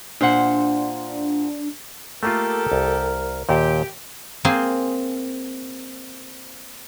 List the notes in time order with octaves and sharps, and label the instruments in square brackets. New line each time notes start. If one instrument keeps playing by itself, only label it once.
[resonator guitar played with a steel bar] A#2 C5 F#5 [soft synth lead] D4
[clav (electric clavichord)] A3 A#3 F4 [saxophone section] G4 A4 [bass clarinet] A#4
[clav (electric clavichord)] C2
[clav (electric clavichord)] D#2 A#2 [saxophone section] G4
[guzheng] A#3 C4 G#4